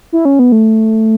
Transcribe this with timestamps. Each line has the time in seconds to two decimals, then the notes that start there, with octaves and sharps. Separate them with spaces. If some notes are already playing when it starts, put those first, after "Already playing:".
0.13 E4
0.25 C#4
0.39 B3
0.52 A3